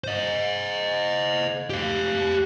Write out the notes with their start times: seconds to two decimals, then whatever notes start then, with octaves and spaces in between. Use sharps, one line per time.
0.04 C5 D#5
1.70 G4 F5